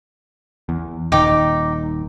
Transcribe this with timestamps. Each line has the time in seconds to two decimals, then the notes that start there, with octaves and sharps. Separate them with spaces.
0.69 E2
1.12 D#1 D#3 D#4 G5 D6